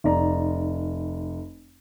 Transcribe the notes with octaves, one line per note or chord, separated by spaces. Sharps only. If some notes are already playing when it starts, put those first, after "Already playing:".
F1 D#4 D5 A#5